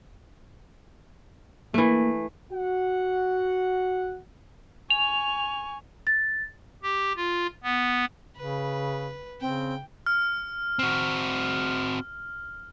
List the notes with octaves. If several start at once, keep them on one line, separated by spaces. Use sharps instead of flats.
E3 A3 A#3
F#4 F#5
G#5 C#6 F7
A6
G4
F4
B3
C#3 B4
C#3 C4 G5
F6
C4 F#4